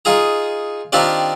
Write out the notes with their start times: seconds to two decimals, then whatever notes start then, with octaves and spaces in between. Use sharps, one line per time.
0.05 D#4 F4 G#4 A#5
0.92 D#3 C4 D4 F4 G4 D5